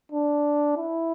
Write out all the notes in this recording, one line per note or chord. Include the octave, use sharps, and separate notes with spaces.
D4
E4